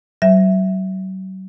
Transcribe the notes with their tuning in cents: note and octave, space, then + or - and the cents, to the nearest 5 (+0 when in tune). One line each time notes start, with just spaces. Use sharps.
F#3 +40 C5 +10 E5 +0